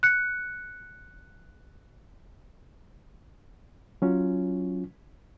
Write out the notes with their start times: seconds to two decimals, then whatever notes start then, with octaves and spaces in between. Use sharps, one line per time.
0.03 F#6 C#7
4.02 F#3 C#4 F4